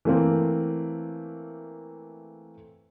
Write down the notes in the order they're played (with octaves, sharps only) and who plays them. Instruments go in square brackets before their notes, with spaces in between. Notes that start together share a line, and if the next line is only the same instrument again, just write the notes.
[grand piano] E3 A3 A#3 C4